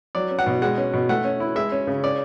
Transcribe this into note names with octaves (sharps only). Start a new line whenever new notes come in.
F#3 D5
C#4
F#5
B2
G#3 F#5
C#4
B2
A3 F#5
C#4
E4
G#3 E5
C#4
C#3
C#4 D5